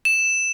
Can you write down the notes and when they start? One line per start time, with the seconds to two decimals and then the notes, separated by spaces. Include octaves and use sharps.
0.05 E7